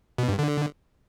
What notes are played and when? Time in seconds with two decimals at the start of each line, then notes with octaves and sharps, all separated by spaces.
0.18 B2
0.29 G2
0.39 D3